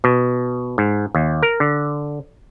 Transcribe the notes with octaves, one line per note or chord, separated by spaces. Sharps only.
B2
G#2
D#2
A#4
D3